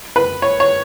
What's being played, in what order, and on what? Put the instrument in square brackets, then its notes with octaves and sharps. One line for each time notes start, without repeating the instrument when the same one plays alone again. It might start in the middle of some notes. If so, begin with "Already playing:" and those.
[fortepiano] B4
C#5
C#5